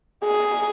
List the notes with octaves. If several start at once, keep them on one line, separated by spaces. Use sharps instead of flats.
G#4